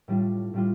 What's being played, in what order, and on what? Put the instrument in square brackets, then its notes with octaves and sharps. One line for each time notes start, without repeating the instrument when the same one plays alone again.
[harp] A2 G3 D4 F4
A2 G3 D4 F4